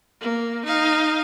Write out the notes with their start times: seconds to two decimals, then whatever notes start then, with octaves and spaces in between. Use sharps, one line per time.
0.21 A#3
0.66 D#4 F5